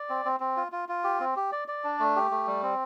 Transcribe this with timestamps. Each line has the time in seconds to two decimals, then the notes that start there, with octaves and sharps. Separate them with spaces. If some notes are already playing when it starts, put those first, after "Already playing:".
Already playing: D5
0.09 C4
0.25 C4
0.40 C4
0.57 F4
0.72 F4
0.89 F4
1.04 G4
1.20 C4
1.36 G4
1.52 D5
1.68 D5
1.84 D4
2.00 A3
2.16 G4
2.31 A3
2.47 G3
2.63 C4